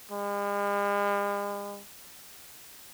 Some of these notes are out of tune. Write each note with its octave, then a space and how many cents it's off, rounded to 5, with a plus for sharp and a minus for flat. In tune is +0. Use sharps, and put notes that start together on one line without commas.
G#3 -45